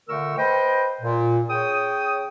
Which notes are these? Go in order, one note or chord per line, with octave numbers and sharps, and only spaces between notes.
A#2 D3 A3 A#4 C#6 E6
B4 C5 D#5 G5
A#2
C#3 C#5 G5 D#6